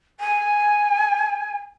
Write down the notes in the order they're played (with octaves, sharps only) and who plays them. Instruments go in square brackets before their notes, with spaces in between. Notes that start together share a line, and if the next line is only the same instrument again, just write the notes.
[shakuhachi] G#5